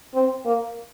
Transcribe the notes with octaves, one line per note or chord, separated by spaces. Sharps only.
C4
A#3